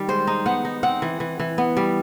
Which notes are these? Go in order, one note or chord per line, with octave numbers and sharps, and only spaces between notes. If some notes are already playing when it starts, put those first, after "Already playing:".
Already playing: D#3 G3
G#3 C5
D#4
B3 F#5
D#4
C4 F#5
E3
E3
E3
B3
G3